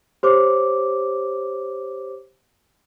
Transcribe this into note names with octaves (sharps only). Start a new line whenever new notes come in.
G4 C5 C#5 D6